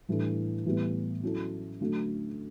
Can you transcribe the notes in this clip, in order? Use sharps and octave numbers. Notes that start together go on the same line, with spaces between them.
A2 E3 G3 D4 A4
A2 E3 G3 B3
F#3 C#4 E4 A4
D3 F#3 A3